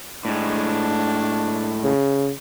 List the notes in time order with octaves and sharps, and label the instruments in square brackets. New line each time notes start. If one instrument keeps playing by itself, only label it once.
[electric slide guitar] A2 G#3 [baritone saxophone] D4
[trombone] C#3